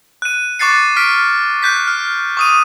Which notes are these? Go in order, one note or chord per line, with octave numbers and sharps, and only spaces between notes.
F#6 D#7
C#6 D6 F#6 A6 C7 C#7
F6 B6 D7
F#6 G6 B6
F6
C#6 D#6 D#7